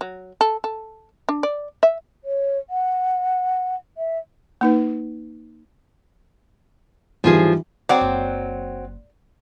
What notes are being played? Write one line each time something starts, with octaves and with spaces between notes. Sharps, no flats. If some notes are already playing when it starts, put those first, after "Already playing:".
F#3
A4
A4
D4
D5
E5
C#5
F#5
E5
A#3 D#4 B4
G#1 E3 F3 G3 F4 G#4
F#3 C4 D5 F#5
F#1